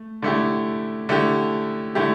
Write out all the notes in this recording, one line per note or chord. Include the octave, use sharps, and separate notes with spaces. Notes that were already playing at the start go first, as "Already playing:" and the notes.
Already playing: A3
D3 A3 E4 G4
D3 A3 E4 G4
D3 A3 E4 G4